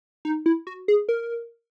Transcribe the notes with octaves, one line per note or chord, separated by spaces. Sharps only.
D#4
E4
F#4
G#4
A#4